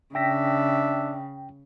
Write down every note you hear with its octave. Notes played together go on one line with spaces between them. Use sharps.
C#3 D4 E5 G5 A#6 B6